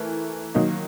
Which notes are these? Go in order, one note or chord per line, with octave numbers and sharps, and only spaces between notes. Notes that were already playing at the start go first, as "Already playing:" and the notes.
Already playing: E3 A3 A#4
D#3 F#3 A#3 D#4